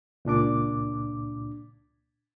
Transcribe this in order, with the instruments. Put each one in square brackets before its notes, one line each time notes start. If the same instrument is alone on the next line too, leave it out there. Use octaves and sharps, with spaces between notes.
[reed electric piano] C#2 A#2 D4 D6